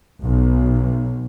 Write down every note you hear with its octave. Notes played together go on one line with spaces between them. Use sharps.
B1